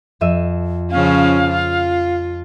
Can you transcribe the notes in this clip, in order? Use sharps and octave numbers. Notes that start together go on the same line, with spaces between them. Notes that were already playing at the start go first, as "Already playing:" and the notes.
F2 E5 D#7
C#3 F3 C#4 F5
F4